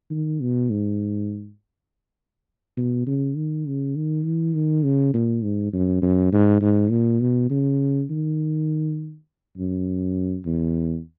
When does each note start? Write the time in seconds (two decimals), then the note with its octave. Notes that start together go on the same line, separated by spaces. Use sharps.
0.10 D#3
0.40 B2
0.70 G#2
2.77 B2
3.07 C#3
3.36 D#3
3.66 C#3
3.96 D#3
4.25 E3
4.54 D#3
4.84 C#3
5.14 A#2
5.42 G#2
5.73 F#2
6.02 F#2
6.32 G#2
6.61 G#2
6.90 A#2
7.21 B2
7.50 C#3
8.10 D#3
9.58 F#2
10.45 E2